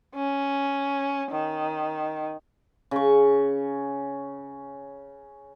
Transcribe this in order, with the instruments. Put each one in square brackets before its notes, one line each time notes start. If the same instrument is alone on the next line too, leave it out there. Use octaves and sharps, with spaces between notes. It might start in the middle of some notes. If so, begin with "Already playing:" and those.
[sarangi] C#4
D#3
[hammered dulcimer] C#3 C#6